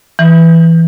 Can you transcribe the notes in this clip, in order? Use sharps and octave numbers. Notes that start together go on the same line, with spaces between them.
E3